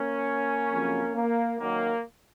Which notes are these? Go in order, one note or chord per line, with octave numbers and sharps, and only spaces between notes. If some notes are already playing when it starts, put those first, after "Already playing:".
Already playing: A#3 C#4
F2 C#3 F#3
A#3
F#2 D#3 F#3 A#3